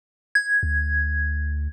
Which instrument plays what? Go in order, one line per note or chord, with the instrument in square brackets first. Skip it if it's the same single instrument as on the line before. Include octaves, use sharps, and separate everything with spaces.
[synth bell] G#6
[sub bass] D2